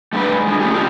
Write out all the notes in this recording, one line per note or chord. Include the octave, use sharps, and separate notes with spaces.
G3 A3 D4 A#4 B4
G#2 C3 G#3
D3 G#3
A3 C#4 G4 G#4
C#3 F4 G4